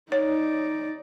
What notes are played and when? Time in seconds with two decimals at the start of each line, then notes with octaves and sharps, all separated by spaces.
0.12 D#4 C#5 D5